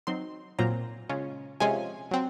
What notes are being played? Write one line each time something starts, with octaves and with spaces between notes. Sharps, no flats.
F#3 C4 D#4 C6
A#2 F#3 C4 F4 A#5
C#3 G#3 C#4 F4
C3 F3 G#3 C#4 F4 G#5
F#3 C4